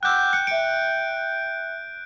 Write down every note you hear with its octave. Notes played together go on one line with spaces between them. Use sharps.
F#5 G5 D6 E6 F#6 G6
F#6 C#7
E5 C#7 D7